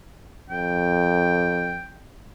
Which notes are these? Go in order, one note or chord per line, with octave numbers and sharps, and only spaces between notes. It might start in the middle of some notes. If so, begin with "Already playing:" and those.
F2 G5